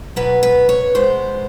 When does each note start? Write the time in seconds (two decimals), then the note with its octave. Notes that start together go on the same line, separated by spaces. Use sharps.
0.16 B2 F#3 B3 B4
0.43 B4
0.69 C#5
0.95 B2 G#3 B3 C5